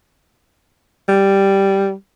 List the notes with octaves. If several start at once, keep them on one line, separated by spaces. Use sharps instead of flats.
G3